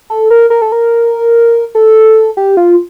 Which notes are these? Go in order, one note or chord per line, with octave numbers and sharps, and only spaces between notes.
A4
A#4
A#4
A4
A#4
A4
G4
F4